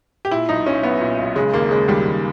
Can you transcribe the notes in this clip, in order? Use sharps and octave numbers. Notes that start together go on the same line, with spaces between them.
G4
A#2 E4
B1 D#4
B1 C#4
B1 B3
A#2
B1
C#3 G#3
D#2 A#3
C#3 G#3
D#2 G3
D#2